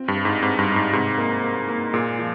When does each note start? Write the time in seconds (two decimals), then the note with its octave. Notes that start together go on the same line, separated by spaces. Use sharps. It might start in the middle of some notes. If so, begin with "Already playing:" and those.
Already playing: C4 F4
0.08 G2
0.17 G3
0.25 G#2
0.42 G#2 C4
0.59 G2
0.67 C4
0.76 G#2
0.93 G#2 C3
1.18 A#3
1.43 A#3
1.68 A#3
1.93 A#2 G#3
2.19 F3